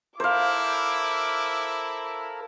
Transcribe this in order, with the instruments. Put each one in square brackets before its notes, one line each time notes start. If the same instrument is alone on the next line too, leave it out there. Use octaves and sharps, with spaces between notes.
[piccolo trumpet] E4 [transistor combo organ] A4 A#4 [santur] C5 F5 [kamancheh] D6